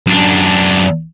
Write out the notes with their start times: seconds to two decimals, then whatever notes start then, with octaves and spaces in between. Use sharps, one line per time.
0.07 F#2 D4